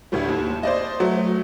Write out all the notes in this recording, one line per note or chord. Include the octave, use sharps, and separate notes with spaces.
D2 A2 G3
D#2
C5 D5 D#5
F#3 A3